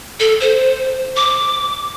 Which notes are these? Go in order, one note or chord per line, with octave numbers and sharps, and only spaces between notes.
A4
C5
D6